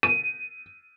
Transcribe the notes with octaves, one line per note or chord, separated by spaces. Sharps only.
D#7